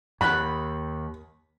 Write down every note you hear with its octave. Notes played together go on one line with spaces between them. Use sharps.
D#2 B5 F#6